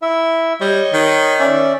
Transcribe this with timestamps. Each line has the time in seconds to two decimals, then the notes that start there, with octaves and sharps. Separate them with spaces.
0.02 E4 E5
0.61 G3 C#5 D#5 C#6
0.93 D#3
1.39 C#4 D5 E5